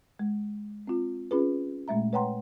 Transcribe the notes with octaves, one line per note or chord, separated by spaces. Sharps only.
G#3
C4 F4
C#4 F4 G#4 B4
A#2 G#3 A3 E5 A#5
B4 C#5 F#5 G5 A#5 C6